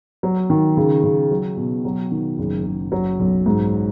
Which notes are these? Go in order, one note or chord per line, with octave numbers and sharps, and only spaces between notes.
F#3
D#3
C#3
C#3
F#3
B2
F#3
D#3
F#1
F#1
F#3
B1
G#2